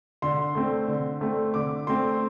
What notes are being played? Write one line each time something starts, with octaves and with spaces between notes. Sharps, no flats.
D3 C6
A3 C4
D3
A3 C4
D3 D6
A3 C4 C6